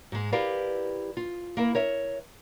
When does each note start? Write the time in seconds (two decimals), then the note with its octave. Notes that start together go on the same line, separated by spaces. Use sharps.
0.12 G#2 G#3
0.32 E4 G4 A#4 B4 D5 F5
1.17 F4
1.57 A#3 E4 A#4
1.75 A#4 C#5 E5